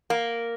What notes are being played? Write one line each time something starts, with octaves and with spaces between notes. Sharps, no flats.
A#3